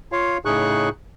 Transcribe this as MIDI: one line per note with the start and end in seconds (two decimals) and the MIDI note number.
0.12 0.37 65
0.12 0.37 73
0.12 0.37 77
0.45 0.89 45
0.45 0.89 49
0.45 0.89 63
0.45 0.89 68
0.45 0.89 85
0.45 0.89 90